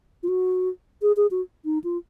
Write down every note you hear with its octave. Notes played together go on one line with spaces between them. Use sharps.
F4
F#4
G#4
G#4
F#4
D#4
F4